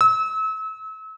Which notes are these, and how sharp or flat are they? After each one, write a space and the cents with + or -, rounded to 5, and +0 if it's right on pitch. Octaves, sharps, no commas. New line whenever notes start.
E6 -35